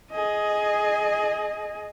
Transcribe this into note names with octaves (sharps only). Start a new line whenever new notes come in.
G#4 D#5